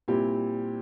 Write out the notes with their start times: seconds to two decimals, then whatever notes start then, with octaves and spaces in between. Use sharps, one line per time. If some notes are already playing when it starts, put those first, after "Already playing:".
0.08 A#2 G3 C4 E4 G4